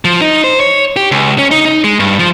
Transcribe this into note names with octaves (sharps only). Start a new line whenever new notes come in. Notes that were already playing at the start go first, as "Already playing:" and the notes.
F3
D#4
C5
C#5
G4
C#2
C#4
D#4
D#4
G#3
G2
F3